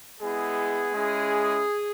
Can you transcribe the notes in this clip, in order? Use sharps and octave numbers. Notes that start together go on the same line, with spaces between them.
G#3 B3 E4 G#4
G#3 C#4 E4